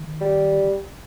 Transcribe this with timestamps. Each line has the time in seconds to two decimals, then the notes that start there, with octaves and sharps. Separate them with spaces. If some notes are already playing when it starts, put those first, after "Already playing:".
Already playing: D#3
0.21 G3